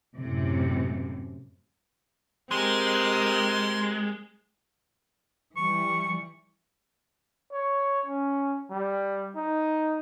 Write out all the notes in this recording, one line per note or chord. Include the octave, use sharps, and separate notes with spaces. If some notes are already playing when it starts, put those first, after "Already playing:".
F#2 A2 C3
G#3 C4 G4 A#4 C6
E3 G3 C#6
C#5
C#4
G3
D#4